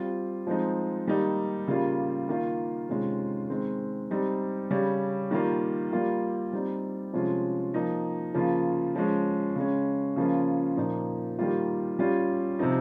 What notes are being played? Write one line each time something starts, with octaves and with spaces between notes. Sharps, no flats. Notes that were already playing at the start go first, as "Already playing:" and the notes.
Already playing: G3 C4 F4
F3 G#3 C4 D#4
D#3 G3 A#3 D#4
C#3 G3 A#3 F4
D#3 A#3 F4
C3 D#3 G#3 C#4 F4
D#3 G#3 C4
G3 C4 D#4
C#3 G3 C#4
D#3 G3 A#3 F4
G3 A#3 F4
G3 C4 D#4
C3 F3 G#3 C#4 F4
F3 A#3 D#4
C#3 F3 A#3 F4
F3 G#3 C#4
C#3 G#3 C#4
C#3 F3 A#3 C#4 F4
A#2 F3 A#3 D#4
D#3 G3 A#3 F4
G3 C#4 F4
C3 F3 C4 D#4